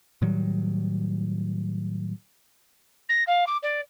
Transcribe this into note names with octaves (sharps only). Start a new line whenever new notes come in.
A2 D#3 F#3 G3
A#6
F5
D6
D5